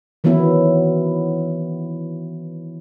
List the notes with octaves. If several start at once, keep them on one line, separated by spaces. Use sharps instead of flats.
D#3 E3 F#3 B3 E4